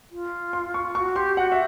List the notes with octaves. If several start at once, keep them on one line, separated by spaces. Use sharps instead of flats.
F4
C6
C#6
F#4 C#6
G4 C6
F#4 F#5
E5